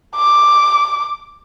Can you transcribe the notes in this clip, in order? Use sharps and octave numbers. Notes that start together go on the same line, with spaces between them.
D6